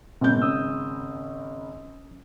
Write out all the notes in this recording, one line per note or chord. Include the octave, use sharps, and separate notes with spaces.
G#1 G2 A#2 C#3 B3 G6
C#4 D#6 E6